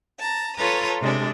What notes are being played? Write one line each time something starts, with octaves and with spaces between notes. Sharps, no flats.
A5 A#5
F4 A4 B4 C#5 A#5 D#6
C3 G#3 D4 A4